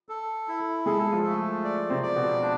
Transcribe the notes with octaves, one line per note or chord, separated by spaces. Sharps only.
A4
E4
G#3 G#4 A4
F3 F4
A3
D5
C3 C4
D5
B2 B3
D4